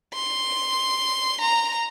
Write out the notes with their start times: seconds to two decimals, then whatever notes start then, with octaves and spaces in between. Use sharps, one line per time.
0.14 C6
1.41 A#5